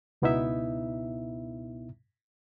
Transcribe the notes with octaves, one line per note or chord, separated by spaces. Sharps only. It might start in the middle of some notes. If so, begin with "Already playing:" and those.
C#2 B2 B3 D#4 E4 E5